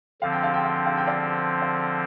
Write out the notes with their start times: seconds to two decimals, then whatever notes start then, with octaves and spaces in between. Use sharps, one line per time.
0.22 D3 F3 C4 F5
0.32 G5
0.43 F5
0.54 G5
0.65 F5
0.76 G5
0.86 F5
0.97 G5
1.07 D5 F5
1.61 D5 F5